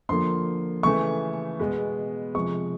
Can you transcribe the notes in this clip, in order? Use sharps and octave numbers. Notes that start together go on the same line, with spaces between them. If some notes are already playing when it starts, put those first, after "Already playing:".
D3 F3 A#3 C6
C#3 E3 A3 C#6
B2 G#3 B3
C3 F3 G#3 C#6